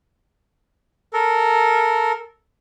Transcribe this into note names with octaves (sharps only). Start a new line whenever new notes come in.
A4 A#4